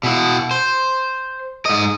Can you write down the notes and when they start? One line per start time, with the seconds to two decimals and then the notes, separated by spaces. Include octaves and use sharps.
0.03 B2 E4
0.51 C5
1.66 G#2 D#5